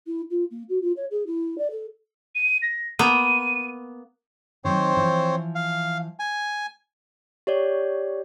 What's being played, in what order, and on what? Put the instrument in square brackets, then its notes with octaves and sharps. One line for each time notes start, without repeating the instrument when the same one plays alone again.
[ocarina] E4
F4
A#3
F#4
F4
C#5
G#4
E4
D5
A4
[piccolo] D#7
A#6
[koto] A#3 B3 [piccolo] D#7
[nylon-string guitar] D#3 F#3 D#4 [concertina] C4 C5 C#5
[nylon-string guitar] E3 F3
[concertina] F5
G#5
[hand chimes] G4 C#5 D5